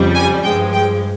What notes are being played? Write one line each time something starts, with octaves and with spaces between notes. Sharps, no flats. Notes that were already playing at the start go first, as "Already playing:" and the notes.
Already playing: F2 C#3 G3
G#5
G2 F3 G#3 G5
G5